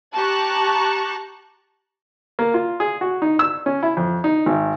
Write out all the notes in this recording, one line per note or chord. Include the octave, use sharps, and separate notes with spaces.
G4 A5 A#5 C#6 F#6
A#3
F4
G#4
F#4
D#4
E6
C#4
E4
F2
D#4
G#1